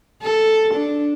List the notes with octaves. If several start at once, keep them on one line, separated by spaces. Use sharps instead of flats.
A4
D4